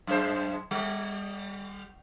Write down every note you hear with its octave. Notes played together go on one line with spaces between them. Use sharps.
F#2 G#3 C5
G3